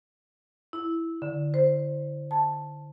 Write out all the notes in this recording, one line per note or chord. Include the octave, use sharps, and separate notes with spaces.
E4
D3
C5
A5